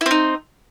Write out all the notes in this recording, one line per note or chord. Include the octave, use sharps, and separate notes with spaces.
C4 D#4 E4